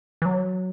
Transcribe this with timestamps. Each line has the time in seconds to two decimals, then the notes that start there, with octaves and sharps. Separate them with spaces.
0.22 E3
0.25 F#3